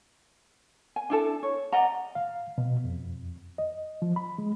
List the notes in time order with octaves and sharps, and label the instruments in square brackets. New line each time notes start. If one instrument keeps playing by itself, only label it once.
[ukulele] G#5
D4 E4 A4
C#5
D5 D#5 F#5 A#5
[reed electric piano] F5
B2
F2
D#5
F3
B5
G#3